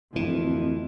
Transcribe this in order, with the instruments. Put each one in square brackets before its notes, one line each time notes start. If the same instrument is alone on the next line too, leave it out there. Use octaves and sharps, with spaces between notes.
[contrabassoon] D1 [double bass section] F2 [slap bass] E3